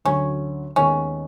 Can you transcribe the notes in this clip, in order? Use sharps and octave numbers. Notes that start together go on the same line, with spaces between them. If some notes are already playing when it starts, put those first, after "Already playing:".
D2 D3 F#3 C#4
D#2 D#3 G#3 B3 C#4